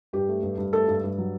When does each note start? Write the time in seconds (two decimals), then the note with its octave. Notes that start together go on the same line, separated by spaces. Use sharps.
0.13 G2 G4
0.29 A3
0.43 G2
0.58 G2
0.73 A3 A4
0.88 G2
1.03 G2
1.18 F#3